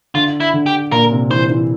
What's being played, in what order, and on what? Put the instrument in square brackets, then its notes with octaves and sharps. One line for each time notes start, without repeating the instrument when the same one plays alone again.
[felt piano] D3 [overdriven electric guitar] F4
[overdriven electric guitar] E4
[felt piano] D3
[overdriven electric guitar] G4
[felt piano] A#2 [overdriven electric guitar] A#4
[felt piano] C3
[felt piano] E3 [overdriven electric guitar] C5
[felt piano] E3